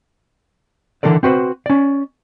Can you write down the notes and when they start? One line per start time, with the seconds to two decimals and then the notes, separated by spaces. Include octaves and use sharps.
1.03 D3 E3 D4 A4 A#4 D5
1.23 C4 F#4 B4 C5
1.66 C#4 D5